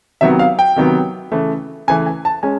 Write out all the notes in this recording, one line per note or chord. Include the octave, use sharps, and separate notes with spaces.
C3 D#3 F#3 B3 E5
F5
G5
C3 D#3 F#3 B3
C#3 E3 A3
C#3 E3 A3 G#5
G#5
A5
G#3 C#4 G#5